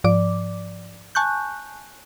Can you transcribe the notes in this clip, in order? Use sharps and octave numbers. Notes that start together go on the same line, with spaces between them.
G#2 F3 D5 D6
G#5 A5 C#6 F#6 G6